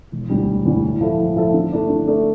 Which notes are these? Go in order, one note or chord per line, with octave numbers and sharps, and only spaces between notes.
E1
D2 D3 G3
E1
D2 D3 G3
A2
F3 A3 E4 A4
A2
F3 A3 E4 A4
D3
A3 D4 A4 D5
D3
A3 D4 A4 D5